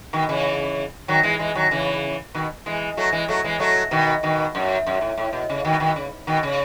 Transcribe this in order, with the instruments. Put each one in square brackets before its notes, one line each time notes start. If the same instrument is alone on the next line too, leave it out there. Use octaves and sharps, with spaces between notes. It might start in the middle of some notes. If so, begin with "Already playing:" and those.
[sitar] B2 D#3
C#3 E3
D#3 F#3
E3 G#3
E3 G#3
D#3 F#3
C#3 E3
B2 D#3
E3 G#3
F#3 A3
E3 G#3
F#3 A3
E3 G#3
F#3 A3
B2 D#3
B2 D#3
F#2
F#2
A2
A2
B2
C#3
B2 D#3
B2 D#3
C#3
B2 D#3
C#3